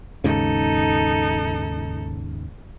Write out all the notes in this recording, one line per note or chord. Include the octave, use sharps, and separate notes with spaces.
D#2 G#2 C#3 D#4 A4